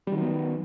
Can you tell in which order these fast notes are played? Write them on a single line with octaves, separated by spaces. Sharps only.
G3 D#3 F#3 B3